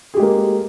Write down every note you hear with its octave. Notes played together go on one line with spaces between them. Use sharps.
G#3 A#3 G4 G#4